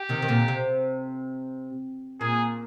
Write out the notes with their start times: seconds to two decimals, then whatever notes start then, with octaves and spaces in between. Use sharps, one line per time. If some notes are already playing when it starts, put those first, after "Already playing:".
Already playing: G4
0.09 C3 D#3
0.22 D#3
0.28 A#2 D3
0.48 C3
2.20 A#2 G#4